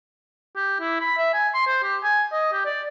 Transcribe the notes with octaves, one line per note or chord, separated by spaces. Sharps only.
G4
E4
B5
E5
G#5
C6
C5
G4
G#5
D#5
G4
D5